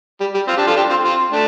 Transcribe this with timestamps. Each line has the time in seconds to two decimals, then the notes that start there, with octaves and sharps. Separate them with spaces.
0.21 G3
0.34 G3
0.48 C4 F4
0.57 D4 G4
0.67 F4 A4
0.76 D4 G4
0.90 C4 F4
1.04 C4 F4
1.32 A3 D4